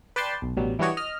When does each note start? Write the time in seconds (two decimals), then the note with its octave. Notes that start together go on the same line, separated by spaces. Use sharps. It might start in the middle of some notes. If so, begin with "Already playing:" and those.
0.16 B4 D5 G5 A5 C6
0.42 B1
0.57 A1 B2 F#3 G3
0.79 E3 G3 D4 F#4 C#5 D#5
0.97 D#5 F6